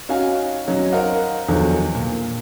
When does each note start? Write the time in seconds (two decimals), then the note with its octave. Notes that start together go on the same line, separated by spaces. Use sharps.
0.09 C#4 D#4 F#4 F5 G#5
0.68 F#3 C#4 D#4
0.92 A#4 C5 D#5 F5 F#5
1.48 E2 D3 D#3 F3 F#3
1.95 A#2